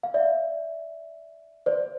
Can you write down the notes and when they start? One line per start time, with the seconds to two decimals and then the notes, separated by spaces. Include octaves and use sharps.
0.03 F5
0.14 D5 E5
1.66 C5 D5